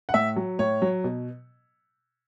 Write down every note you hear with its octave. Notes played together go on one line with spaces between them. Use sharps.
F#5
A2 E5
F#3
A2 C#5
F#3
B2